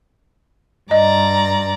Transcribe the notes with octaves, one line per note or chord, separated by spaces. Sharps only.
G2 D5 D#5 A#5